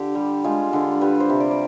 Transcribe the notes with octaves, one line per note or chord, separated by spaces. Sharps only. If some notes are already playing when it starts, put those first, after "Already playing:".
Already playing: D3 F4 G4
G3
G#3 F4
D3
G3 B4
C5
C3
D5
D5